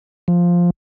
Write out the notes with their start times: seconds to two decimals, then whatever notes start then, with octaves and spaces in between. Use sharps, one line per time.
0.28 F3